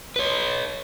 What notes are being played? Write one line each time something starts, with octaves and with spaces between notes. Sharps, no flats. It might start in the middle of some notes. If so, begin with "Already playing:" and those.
B4 C#5